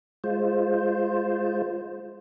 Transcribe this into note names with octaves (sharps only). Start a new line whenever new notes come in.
G#3 F4 C5